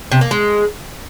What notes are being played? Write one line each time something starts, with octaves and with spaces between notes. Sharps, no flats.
C3
A#3
G#3